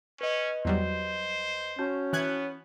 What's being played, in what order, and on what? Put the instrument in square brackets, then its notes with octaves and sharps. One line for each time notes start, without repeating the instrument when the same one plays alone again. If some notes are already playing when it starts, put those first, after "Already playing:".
[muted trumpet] C#4 [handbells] B4 D#5
[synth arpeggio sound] E2 F#3 G3 [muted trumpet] C5
[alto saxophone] C#4 [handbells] F#4 A5 G6
[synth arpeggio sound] E3 F#6 G#6 [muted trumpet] B3